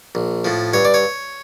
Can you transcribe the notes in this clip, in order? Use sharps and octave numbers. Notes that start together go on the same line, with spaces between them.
A#1
A2 F3
G2 C#5
D5
C#5